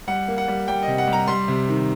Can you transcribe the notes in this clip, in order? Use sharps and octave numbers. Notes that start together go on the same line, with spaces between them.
G3 F#5
A#3
F#5
G3
G3 G5
C3 D#5
F#5
G3
A#5
G3 C6
C3
D#3